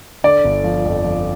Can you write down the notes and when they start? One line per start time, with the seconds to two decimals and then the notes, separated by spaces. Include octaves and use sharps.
0.24 D3 D5
0.44 G1
0.64 F3
0.85 F2
1.04 F3